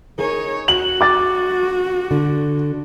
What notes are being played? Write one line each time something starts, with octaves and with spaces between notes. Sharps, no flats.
D#4 G#4 A#4 C#5 G#5
F#4 F#7
D6 A6
D3